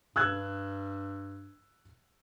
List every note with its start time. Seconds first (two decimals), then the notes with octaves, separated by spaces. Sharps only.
0.16 G2 E6 F#6 G#6